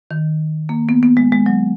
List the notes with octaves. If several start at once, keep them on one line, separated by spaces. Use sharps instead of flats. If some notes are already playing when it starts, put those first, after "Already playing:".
D#3
A#3
B3
B3
G#3
G#3
F#3